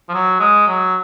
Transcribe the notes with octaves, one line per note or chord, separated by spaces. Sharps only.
F3
F#3
G#3
F#3